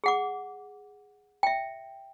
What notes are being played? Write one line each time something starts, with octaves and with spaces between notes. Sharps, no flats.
G#4 F#5 D6
E5 G5